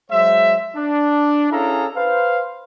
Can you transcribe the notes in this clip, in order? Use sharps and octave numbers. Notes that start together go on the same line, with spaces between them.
F#3 G#3 C5 E5
D4
C#4 E4 G#4 A4 F5 A#5
B4 C5 F5